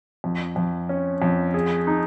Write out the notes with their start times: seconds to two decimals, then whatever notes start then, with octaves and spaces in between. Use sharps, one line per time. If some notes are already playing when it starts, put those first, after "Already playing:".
0.24 F2
0.56 F2
0.89 C#4
1.22 F2
1.54 G#4
1.87 D#4